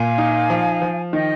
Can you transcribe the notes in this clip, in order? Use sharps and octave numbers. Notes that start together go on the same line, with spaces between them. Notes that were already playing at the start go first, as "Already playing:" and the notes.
Already playing: A#2 F5 G#5
D#4
F3
F3
D#3 D#5 G5